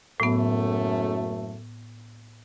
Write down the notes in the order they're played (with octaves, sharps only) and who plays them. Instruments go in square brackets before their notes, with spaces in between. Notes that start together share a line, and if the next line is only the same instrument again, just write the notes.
[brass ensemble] F#1 F#2 A3 [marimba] A2 B3